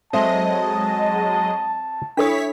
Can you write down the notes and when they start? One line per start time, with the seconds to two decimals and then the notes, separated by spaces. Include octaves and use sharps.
0.13 F#3 G#3 C4 A4 D#5 E5 A5
2.17 D4 E4 A4 C#5 D#6 B6